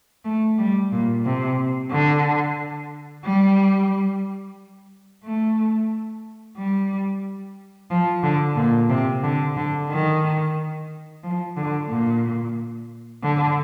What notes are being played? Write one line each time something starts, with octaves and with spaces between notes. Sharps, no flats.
A3
G3
A#2
C3
D3
G3
A3
G3
F3
D3
A#2
C3
D3
D3
D#3
F3
D3
A#2
D3